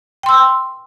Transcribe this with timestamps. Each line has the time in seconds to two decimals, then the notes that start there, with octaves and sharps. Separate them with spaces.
0.23 G5
0.26 C6
0.29 E6